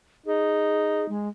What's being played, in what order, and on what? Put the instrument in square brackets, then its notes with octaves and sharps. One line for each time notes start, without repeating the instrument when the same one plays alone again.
[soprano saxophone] D#4 [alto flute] G#4
[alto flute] G#3